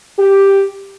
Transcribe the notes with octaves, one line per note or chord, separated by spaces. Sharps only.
G4